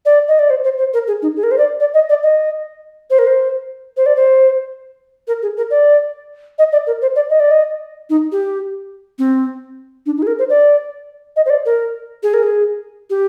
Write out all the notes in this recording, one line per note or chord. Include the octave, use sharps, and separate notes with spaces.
D5
D#5
D5
C5
C5
C5
A#4
G#4
D#4
G#4
A#4
C5
D5
D5
D#5
D5
D#5
C5
A#4
C5
C5
D5
C5
A#4
G#4
A#4
D5
D#5
D5
A#4
C5
D5
D#5
D5
D#5
D#4
G4
C4
D4
D#4
G#4
A#4
C5
D5
D#5
C5
D5
A#4
G#4
A#4
G#4
G4